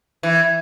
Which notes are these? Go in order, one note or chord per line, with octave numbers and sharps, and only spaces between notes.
E3